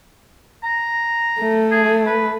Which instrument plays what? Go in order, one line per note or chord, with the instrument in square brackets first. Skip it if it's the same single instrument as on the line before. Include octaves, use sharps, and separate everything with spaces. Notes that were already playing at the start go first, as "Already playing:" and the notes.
[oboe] A#5
[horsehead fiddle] A3
[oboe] G#4
B4